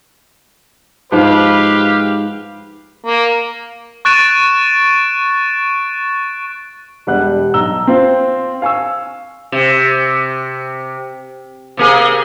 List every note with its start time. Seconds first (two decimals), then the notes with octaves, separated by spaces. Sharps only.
1.12 G#2 F3 G4 B4 C5 F5
3.06 A#3
4.05 C#6 F#6 A6 D7 E7
7.07 E1 G3 F#5 F#6
7.54 B1 A#5 E6 G7
7.87 C4 F4 C5
8.62 F5 G#5 C#6 E6
9.52 C3
11.77 C3 A#3 G#4